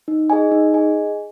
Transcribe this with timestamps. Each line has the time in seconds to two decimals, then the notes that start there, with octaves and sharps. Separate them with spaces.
0.08 D#4
0.30 G#4 D#5 G#5
0.52 D#4
0.74 G#4 D#5 G#5